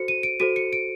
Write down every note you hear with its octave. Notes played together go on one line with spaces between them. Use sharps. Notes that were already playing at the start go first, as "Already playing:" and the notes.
Already playing: F#4 A4 C5 C#7
D#7
D7
F#4 A4 C5 D#7
C#7
D7